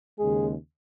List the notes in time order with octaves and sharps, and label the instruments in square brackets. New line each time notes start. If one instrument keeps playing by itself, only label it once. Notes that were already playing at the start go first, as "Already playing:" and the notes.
[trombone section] D#2 C#3 G#3 G#4